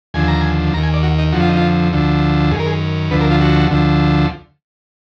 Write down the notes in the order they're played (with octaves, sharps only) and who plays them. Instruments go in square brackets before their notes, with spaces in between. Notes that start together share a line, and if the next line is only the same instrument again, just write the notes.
[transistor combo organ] D#2 D3 F3 G#5
A#5
G#5
D#2 A#5
D#3
G#5
D5
F#4
D#4
F2 D3 F3 F#4
F4
D#4
F4
D2 D3 F3
F#2 G#4
D#3 A#4
G#4
D2 D3 F3 B4
A#4
F4
F#4
D2 D3 F3